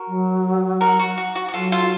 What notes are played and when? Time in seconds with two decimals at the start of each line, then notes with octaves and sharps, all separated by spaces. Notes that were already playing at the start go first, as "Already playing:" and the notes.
Already playing: F#4 A#4
0.08 F#3
0.81 F#4 A#4
0.99 F#4
1.18 F#4
1.35 F#4
1.48 F#4
1.54 F#3 F4 A4
1.72 F4 A4